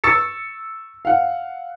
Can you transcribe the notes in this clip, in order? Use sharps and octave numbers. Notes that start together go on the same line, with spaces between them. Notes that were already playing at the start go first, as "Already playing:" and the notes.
C#6 E6 A6 C#7
F5 F#5